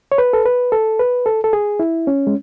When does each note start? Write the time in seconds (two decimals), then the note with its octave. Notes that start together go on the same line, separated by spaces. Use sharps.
0.12 C#5
0.18 B4
0.33 A4
0.45 B4
0.72 A4
0.99 B4
1.26 A4
1.44 A4
1.53 G#4
1.80 E4
2.07 C#4
2.27 G#3